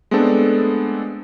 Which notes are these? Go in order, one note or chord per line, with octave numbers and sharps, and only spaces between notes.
G#3 A3 B3 C4 D4 A4